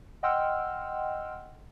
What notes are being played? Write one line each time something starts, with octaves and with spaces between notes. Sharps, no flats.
D#5 F#5 G5 C6 E6 F6